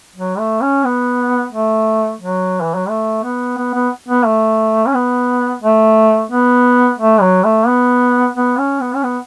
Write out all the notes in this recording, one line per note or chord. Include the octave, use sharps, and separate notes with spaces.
F#3
A3
C#4
B3
A3
F#3
E3
F#3
A3
B3
B3
B3
B3
A3
C#4
B3
A3
B3
A3
F#3
A3
B3
B3
C#4
B3
C#4
B3